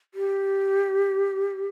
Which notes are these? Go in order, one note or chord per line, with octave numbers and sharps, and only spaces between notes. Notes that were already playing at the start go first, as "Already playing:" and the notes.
G4